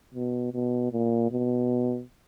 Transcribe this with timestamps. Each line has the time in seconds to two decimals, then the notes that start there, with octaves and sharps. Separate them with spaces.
0.15 B2
0.53 B2
0.92 A#2
1.31 B2